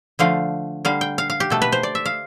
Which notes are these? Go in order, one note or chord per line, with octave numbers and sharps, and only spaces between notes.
D3 F3 A3 F5
D3 G3 F5
G5
F5
F5
G4
B2 A3 A4
B4
C5
D5
E5
F5